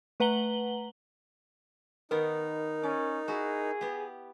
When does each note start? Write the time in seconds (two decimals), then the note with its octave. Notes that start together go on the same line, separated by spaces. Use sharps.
0.20 A3 B4 F#5 A#5 F#7 G7
2.11 D#3 B3 D#4 A#4
2.83 C#4 D5
3.28 E4 F#4 G#4
3.81 B3 G4